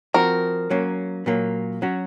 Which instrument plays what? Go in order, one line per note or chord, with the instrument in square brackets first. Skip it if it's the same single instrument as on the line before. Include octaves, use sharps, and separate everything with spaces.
[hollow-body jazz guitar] F3 C4 F#4 [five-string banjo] A#4
[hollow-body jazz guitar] F#3 A#3 C#4
A#2 F#3 A#3
F#3 C#4 F#4